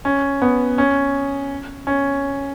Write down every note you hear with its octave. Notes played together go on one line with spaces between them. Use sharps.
C#4
B3
C#4
C#4